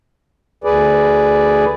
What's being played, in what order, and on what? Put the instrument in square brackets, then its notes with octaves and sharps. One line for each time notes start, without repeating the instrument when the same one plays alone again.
[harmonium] D2 G#4 B4 D5